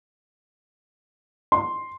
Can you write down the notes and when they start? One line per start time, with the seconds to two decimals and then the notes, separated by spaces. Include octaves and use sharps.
1.52 C6